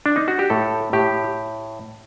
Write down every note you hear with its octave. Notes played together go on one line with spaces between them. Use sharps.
D4
D#4
F#4
G4
A2 A4
A2 G4